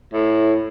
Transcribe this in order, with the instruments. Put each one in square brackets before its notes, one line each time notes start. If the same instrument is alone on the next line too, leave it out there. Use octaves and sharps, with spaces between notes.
[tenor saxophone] A2